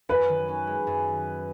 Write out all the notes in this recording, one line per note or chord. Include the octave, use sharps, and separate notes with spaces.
F#2 B4
D#3
C#4
G#3
F#2